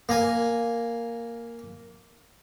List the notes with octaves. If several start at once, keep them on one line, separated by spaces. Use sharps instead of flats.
A#3 G#5